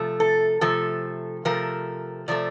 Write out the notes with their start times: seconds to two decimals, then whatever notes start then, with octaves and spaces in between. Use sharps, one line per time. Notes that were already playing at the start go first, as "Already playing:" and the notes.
Already playing: C3 F3 A3
0.20 A4
0.61 C3 F3 A3 A4
1.45 C3 F3 A3 A#4
2.28 C3 F3 A3 D5